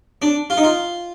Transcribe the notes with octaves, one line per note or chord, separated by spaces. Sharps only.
D4
F4
D#4
F4